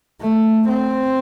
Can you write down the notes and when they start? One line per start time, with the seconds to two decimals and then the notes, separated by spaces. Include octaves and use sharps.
0.21 A3
0.69 C4